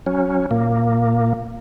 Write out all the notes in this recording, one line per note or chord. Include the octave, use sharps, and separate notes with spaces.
F#3 C#4
A#2 A#3